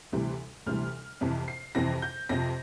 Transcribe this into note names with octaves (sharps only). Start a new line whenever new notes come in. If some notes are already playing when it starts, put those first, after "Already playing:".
D2 C3 E3 G3
D2 C3 E3 G3 F6
F2 C3 E3
C7
F2 C3 E3 A#6
G6
F2 C3 F3 A#6